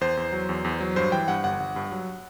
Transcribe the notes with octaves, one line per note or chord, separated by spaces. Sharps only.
E2 C5
E2
F#3
E2
E2
F#3
G2 C5
E3 G5
G2 F#5
G1 F#5
G1
G2
F#3